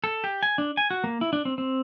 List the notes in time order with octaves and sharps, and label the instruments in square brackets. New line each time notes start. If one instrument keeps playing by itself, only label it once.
[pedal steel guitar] A4
G4
G#5
D4
G#5
F#4
A#3
E4
D4
C4
C4